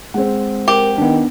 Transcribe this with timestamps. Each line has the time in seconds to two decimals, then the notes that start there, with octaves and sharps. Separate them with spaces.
0.14 G#3 C4 F#5
0.68 G4 A#4
0.98 D#3 B3 D4